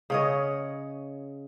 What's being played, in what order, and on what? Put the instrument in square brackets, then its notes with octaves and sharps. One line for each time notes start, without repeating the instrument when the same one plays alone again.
[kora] C#3 C#5 D#5